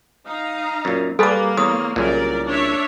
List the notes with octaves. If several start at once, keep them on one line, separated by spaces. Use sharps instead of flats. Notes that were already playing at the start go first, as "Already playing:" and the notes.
D#4 F5 A#5
F#2 A#2
G3 A#3 G#4 A4 B4 A5 D6
E2 C#5 D#6
C2 A#2 C#3 F#3 A#4 D5
D4 C#5 E5